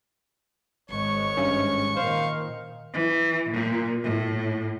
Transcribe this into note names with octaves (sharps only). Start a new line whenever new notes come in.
G#1 G#2 C#5 C#6
G2 C#4
A#2 D#3 C5 F5
E3
A#2
A2